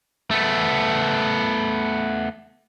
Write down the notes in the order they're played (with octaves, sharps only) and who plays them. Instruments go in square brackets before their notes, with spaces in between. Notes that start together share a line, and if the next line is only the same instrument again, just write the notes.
[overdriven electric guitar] A3 B3